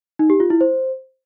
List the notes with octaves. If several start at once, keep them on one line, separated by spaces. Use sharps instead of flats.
D#4
G4
F4
E4
C5